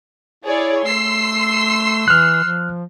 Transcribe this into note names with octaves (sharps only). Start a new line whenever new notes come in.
E4 G#4 C#5 D5
A3 C6 E6 C7
E3 F6 F#6
F3